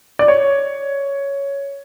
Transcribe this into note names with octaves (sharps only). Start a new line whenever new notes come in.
D5
C#5